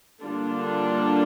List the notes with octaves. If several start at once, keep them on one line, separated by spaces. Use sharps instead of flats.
D3 G3 A#3 D4 F4